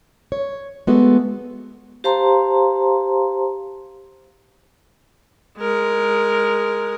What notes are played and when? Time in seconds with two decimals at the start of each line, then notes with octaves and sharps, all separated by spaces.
0.32 C#5
0.87 G#3 A3 B3 F#4 A4
2.04 G4 C5 F5 A5 A#5 C6
5.58 G#3 A#4